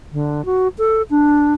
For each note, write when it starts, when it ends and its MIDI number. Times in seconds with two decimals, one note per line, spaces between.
0.13 0.45 50
0.45 0.68 66
0.78 1.02 69
1.10 1.54 62